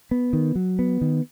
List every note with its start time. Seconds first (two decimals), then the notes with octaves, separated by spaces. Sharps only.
0.11 B3
0.33 D#3
0.55 F#3
0.79 B3
1.01 D#3